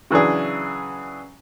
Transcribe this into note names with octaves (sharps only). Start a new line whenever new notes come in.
C#3 E3 F#3 D4 G#4